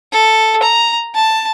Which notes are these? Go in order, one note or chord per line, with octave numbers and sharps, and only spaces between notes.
A4
A#5
A5